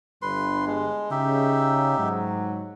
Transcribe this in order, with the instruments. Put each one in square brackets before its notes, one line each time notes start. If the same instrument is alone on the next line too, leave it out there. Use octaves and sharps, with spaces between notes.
[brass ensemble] G1 G2 [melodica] B4 C6
[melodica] G#3
[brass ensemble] C#3 [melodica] D#4 G4 E5
[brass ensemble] G#2 F#3